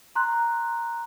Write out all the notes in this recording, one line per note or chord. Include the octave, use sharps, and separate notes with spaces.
A#5 C6 F#6